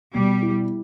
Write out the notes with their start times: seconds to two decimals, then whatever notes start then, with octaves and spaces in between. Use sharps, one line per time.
0.15 B2 G3
0.42 E4